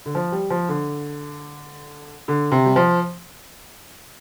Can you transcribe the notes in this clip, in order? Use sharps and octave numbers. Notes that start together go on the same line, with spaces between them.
D3
F3
G3
F3
D3
D3
C3
G3
F3